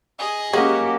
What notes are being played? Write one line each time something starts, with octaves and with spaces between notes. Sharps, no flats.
G#4 D#5
F#3 G#3 A#3 C#4 F#4 G4